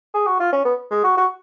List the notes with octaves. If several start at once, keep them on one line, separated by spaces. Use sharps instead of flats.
G#4
F#4
F4
C#4
B3
G#3
F#4
F#4